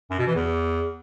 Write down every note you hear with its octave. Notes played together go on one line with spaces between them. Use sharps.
F#2
B2
E3
E2